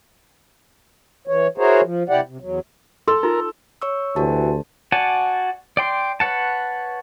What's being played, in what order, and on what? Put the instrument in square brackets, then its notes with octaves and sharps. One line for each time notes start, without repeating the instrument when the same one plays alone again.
[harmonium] E3 C#5
E4 F#4 G#4 A#4 C5 C#5
F3
C3 E4 G4 D5 F#5
C3
E2 F#3
[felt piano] A4 [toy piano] C6
[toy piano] D#4 F4 [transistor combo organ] A#4
[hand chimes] C#5 C#6 E6
[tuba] D2 [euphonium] E3 [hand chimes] F#4 G4 A5
[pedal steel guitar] F#4 D5 F#5 G#5 A5
D5 G5 C6
B4 C#5 F#5 A5